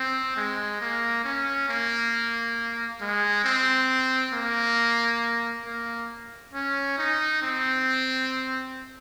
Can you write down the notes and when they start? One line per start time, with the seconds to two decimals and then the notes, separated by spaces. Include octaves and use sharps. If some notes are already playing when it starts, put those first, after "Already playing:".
Already playing: C4
0.37 G#3
0.81 A#3
1.25 C#4
1.69 A#3
3.01 G#3
3.45 C4
4.33 A#3
5.66 A#3
6.54 C#4
6.98 D#4
7.43 C4